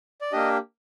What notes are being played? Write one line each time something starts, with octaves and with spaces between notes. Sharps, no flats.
D5
A#3 D4 G4 D#5